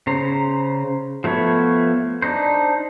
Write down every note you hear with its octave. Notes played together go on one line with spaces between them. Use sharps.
C#3 C5 A#5
F3 A3 B3 C#5
D4 D#4 C5